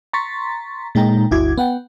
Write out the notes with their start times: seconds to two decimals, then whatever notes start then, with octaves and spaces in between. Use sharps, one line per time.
0.13 A#5 C6 C#6 A6 B6
0.95 A#2 G#3 D#4 G5 A#5
1.31 G1 D2 E4 F#4 D6 G#6
1.58 B3 F#5 G5